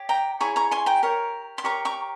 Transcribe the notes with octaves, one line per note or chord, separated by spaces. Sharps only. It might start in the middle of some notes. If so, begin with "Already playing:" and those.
Already playing: G4 C#5
G5 A#5
E4 G#4 C#5 A#5 C#6
A#5 C#6
G#5 C6
G5 A#5
G4 A#4 C#5
C6
G4 A#4 C#5 A#5 C#6
A#5 C#6